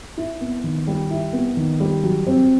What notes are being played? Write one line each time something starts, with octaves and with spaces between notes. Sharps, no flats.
E4
B3
D#3
G3
E4
B3
D#3
G3
F#3
C4